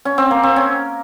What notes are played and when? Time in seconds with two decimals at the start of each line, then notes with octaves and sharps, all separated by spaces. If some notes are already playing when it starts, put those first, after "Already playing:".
0.05 C#4
0.18 C4
0.31 A#3
0.43 C4
0.56 C#4